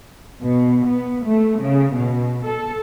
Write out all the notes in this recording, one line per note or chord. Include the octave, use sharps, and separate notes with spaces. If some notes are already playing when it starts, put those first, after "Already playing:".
B2
B3
A3
C#3
B2
A4